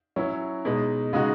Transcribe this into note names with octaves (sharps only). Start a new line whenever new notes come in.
F#3 C#4 E4
B2 G#3 D#4
C#3 G#3 D#4 F#4